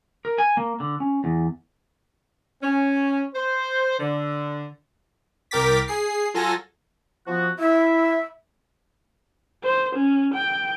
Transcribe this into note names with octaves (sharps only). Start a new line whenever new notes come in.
A#4
G#5
A#3
D3
C#4
E2
C#4
C5
D3
C2 A#4 G5 D6 A6 B6
G#4 C7
F#3 F4 A4 G#5 A#6
F3 B3 F#4
E4 E5
C5
C#4
G5